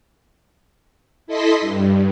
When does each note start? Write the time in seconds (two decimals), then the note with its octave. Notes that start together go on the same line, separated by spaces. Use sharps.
1.27 E4 A4 D#5 C6 B6
1.61 G2